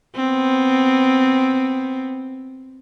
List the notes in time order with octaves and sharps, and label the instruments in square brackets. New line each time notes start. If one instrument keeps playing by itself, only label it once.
[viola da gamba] B3 C4